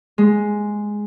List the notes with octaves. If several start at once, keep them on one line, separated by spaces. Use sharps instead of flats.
G#3